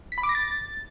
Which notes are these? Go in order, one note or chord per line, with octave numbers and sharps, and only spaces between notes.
B6
B5
D6
A#6
A6